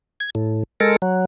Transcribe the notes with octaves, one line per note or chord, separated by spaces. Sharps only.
G#6
A2
G#3 A4 A#4
F#3